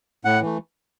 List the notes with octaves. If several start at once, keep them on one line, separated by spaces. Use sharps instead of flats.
A2 F#5
E3 A3